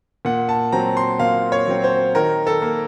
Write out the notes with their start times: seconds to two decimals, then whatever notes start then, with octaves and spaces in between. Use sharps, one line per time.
0.25 A#2 F#5
0.49 A5
0.72 F#3 C4 A#5
0.97 C6
1.20 A#2 F5
1.52 C#5
1.67 F#3 C4
1.84 C5
2.15 D#3 A#4
2.47 A4
2.62 A#3